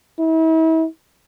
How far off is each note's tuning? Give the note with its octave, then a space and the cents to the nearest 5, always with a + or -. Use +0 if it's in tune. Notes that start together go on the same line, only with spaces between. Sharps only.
E4 -40